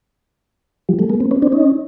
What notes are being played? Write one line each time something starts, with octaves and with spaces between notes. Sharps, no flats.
F3 G3
G3 A3
G#3 A#3
A#3 C4
B3 C#4
C4 D4
C#4 D#4